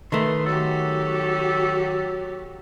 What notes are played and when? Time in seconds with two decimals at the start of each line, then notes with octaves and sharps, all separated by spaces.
0.12 D#3 A3 B4 C6
0.46 F#3 F#4 G4 A4